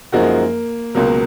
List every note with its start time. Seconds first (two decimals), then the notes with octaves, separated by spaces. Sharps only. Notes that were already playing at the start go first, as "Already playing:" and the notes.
0.12 F#2 F3 G#3 A#3 D#4 F#4
0.95 C#2 B2 F#3 A#3